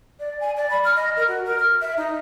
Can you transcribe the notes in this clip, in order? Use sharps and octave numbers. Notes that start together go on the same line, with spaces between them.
D5
G#5
D5
B5
F6
D#5
A#4
F#4
A#4
F6
E5
D#4